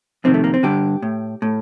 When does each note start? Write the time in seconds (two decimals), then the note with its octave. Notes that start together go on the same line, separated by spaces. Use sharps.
0.24 F2 C3 D#3 C4
0.34 A3
0.44 A#3
0.54 C4
0.63 G2 D3 G4
1.02 A2
1.42 A2